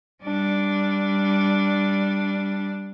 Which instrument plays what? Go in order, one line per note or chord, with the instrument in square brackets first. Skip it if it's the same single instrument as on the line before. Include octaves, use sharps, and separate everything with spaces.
[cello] G3 D4